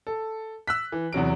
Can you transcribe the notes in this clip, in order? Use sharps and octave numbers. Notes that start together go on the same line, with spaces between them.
A4
E6 F#6 B6
E3
E2 C3 F#3 D7